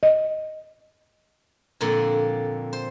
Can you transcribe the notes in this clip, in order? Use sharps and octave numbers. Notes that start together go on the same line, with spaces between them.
D#5
F2 A#2 D3
C5